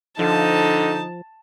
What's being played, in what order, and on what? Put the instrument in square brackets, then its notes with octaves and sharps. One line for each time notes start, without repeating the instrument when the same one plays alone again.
[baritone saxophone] D3 [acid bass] F3 [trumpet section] D#4 [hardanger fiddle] A5